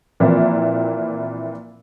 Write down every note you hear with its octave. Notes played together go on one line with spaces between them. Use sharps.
A#2 E3 F3 A#3 C4 E4